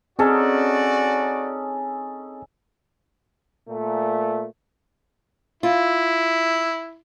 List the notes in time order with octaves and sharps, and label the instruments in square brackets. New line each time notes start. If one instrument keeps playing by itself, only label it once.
[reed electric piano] C4 G#4 [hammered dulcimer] C#4 D#4 A4 [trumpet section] F#4 D5
[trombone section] A#2 A3
[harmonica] E4 [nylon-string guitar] F4